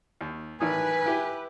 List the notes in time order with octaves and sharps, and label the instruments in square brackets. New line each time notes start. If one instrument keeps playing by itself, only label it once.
[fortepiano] D#2
[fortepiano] A1 D#3 D#6 [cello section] B4 [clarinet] G#5
[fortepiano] E4 G4